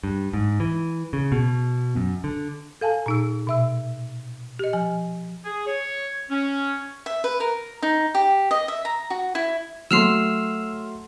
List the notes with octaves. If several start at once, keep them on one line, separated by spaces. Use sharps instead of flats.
G2
G#2
E3
C#3
B2
F#2
D3
A4 F5 G#5 A5
A#2 D#4 E6
B2 E5 E6
G4 D#5
F3 G#5
G#4
C#5
C#4
E5
B4
A#4
D#4
G4
D#5
E5
A#5
F#4
E4
F#3 A3 C6 E6 F6 C7